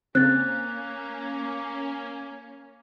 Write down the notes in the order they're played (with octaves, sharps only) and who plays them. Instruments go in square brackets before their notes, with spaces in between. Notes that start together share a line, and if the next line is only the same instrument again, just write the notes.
[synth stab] C#3 C4 [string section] A#3 C#4 [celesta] F#6 A6